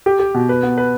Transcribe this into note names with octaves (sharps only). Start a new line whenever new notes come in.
G4
G4
B2
B4
B3
B4